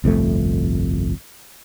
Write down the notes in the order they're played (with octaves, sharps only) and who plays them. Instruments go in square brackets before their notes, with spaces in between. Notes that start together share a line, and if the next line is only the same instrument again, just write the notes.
[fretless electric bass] G1 C2 F2 A3